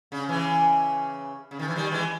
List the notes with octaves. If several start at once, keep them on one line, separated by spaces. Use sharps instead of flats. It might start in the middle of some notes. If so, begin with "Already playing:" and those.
C#3
C#3 E3
C#3
D#3
E3
D#3 G3
E3 G#3